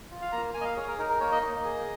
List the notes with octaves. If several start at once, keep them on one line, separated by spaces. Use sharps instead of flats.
F4
F5
A#3 A#5
A#3 G#5
D#5
F5
G#4 C#5
A#4
D#4 A#4
A#4
A#3 C#5
D#5
A#3
G#4